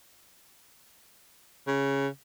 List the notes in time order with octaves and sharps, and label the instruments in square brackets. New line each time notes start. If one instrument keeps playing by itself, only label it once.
[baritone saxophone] C#3